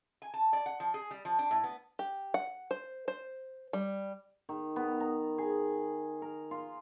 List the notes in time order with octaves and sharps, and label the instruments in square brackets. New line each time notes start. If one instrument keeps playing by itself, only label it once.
[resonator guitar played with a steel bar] G#5
A5
D5
F#5
F3
G#4
G3
F3
D4
A2
B3
[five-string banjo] G4
F#5
C5
C5
G3
[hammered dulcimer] D#3
B3
A#5
G#4
A#4
F4